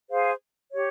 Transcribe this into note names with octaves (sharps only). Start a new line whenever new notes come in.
G#4 C5 F5
G4 C#5